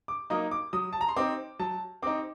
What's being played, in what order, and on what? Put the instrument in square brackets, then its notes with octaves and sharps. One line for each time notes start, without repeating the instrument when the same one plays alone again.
[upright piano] D6
F#3 A#3 D#4 D#6
D6
F#3 D#6
A5
A#5
C6
C4 D#4 D6
F#3 A5
C4 D#4 D6